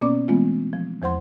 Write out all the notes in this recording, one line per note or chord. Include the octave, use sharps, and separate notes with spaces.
B2 A#3 B3 C#4 D5 D6
E3 G#3 A3 B3 C4 F4
F3
E2 F3 C5 F#5 C6